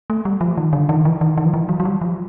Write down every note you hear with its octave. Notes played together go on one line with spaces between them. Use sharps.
A3
G3
F3
D#3
D3
D#3
E3
D#3
D#3
F3
E3
F#3
F#3
G3
F3